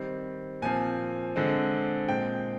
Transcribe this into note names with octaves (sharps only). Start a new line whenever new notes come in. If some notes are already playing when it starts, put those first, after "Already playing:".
Already playing: D#3 G3 C4
A#2 F3 C4 G#5
D3 G#3 C4
A#2 G#3 C4 G5